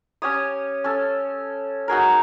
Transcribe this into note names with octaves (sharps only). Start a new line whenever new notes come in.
C#4 G4 C#5 D#6
C#4 A4
D#4 F#4 G#4 A#4